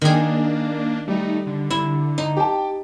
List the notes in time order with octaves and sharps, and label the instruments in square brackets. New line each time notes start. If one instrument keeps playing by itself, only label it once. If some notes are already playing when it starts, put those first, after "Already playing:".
[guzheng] D#3 G#4 [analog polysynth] A#3 D4
[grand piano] G3 [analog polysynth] A3 D#4
[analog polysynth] D3
[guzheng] E4
D#4
[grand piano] G4 G5 A5